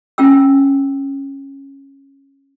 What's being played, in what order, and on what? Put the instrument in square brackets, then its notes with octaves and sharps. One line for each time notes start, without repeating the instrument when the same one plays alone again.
[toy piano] C#4 F4 G5 E6